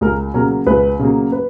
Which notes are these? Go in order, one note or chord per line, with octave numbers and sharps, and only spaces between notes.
C#2 A#4
C#3 F#3 A#3 A#4
C#2 B4
C#3 F#3 A#3
B4